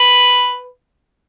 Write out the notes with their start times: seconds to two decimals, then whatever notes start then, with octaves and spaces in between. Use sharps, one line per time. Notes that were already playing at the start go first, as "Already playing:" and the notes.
Already playing: B4